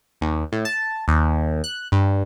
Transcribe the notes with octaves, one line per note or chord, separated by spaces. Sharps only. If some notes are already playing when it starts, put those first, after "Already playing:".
D#2
A2
A5
D#2
F#6
G2